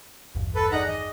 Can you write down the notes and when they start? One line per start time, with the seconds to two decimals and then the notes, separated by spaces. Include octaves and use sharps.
0.35 A1 E2 G2
0.55 A4 B4
0.72 D#4 G#4 D5 F#5 A#5
0.88 D#3 D#5